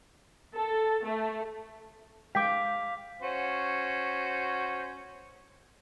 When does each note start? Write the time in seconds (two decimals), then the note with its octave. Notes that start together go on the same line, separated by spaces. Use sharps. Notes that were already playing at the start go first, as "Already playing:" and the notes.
0.55 A4
1.05 A3
2.35 G#3 F5 G5 D6 B6
3.22 C#4 F#4 C5